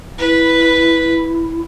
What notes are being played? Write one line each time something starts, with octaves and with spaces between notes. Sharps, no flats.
E4 B4